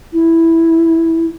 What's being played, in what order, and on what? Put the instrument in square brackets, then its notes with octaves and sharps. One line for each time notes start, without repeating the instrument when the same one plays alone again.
[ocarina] E4